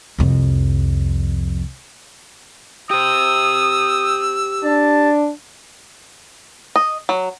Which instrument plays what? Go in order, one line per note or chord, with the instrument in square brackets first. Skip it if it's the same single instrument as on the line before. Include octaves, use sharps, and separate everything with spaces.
[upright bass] C2 F2
[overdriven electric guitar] G4 C5 [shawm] D#6 [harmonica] E6
[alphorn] D4 [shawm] A5
[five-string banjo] D#5
F#3